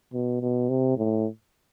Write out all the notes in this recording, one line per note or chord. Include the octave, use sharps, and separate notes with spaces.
B2
B2
C3
A2